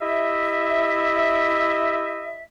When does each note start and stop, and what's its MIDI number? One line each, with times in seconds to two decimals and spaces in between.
0.01 2.43 64
0.01 2.43 67
0.01 2.43 75
0.01 2.43 76